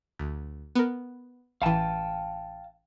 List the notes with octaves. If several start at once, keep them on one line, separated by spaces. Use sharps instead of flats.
D2
B3 A#4
A1 E3 F5 G5 A5